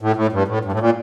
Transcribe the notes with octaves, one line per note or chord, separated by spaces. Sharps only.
A2
A2
G2
A2
G2
A2
A#2